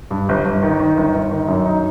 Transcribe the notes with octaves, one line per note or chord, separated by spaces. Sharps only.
G2
G1
G1
D#3
D#3
G1
G1
D#3
F#2
D#4